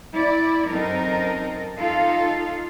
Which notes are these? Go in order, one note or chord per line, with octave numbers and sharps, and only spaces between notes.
E4 D5
F#2 C4 D#4 A4 A#4
D#4 F4 A4 F5